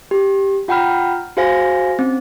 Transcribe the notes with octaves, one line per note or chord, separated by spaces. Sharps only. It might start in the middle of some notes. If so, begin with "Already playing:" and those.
G4
F4 F#5 G5 A#5 B5 F6
F#4 G#4 C5 F5 G#5 A#6
C4 C#4